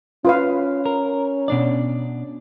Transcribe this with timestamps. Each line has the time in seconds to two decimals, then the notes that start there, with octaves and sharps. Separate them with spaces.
0.25 C#4 F4 B4 F5
0.86 A#4
1.48 B2 D4 D5